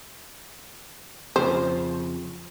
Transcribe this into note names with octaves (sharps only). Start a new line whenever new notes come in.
F2 C#3 F3 C5